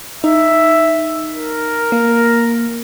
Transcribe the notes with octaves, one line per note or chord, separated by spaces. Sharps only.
D#4 E5
A#4
A#3